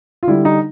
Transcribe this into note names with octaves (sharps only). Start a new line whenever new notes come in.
F4
D3 G3 E4
D#4